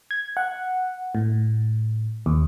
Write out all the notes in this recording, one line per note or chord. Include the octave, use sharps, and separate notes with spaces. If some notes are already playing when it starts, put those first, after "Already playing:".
G#6
F#5
A2
D#2